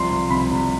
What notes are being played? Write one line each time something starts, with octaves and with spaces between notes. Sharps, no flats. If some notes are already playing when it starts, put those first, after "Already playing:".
Already playing: C2 F3 C6
C2
C3 B5
C2